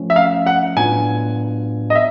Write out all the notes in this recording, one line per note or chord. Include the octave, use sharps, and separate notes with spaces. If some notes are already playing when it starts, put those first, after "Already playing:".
Already playing: F3 A3 C#4
E5
F5
F#5
A2 F#3 B3 D4 F4 G#5
D#5
E5